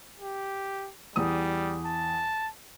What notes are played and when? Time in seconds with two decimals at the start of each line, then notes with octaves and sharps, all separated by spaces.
0.19 G4
1.16 E2 G3 D#6
1.85 A5